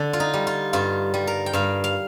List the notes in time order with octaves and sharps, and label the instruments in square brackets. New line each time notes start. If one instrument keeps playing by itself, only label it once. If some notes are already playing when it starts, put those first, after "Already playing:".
Already playing: [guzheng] D3 D4
F4
D#4
G3
F4
G2 F4
G3
A#4
G5
G2 F5
F5